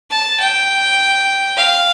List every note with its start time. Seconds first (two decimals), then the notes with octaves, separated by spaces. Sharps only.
0.10 A5
0.40 G5
1.57 F5